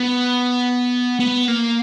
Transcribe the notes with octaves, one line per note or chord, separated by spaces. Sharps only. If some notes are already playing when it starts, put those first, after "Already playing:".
Already playing: B3
B3
A#3